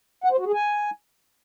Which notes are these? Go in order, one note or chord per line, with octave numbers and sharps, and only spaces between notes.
F#5
C5
F#4
G#4
G#5